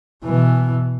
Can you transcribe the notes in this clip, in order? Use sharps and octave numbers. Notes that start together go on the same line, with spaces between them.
B2 E3